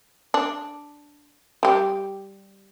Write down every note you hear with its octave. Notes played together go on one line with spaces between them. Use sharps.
D4
G3 G4